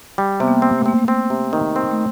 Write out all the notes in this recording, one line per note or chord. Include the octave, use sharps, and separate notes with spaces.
G3
C3 B3
A#3
C4
A3
A#3 C4
A3
C4
C3
D#3
C4
A3